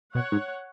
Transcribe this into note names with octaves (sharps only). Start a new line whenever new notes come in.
B2 C#5 F#5
G#2